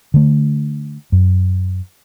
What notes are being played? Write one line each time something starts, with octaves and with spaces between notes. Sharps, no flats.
D3 A3
F#2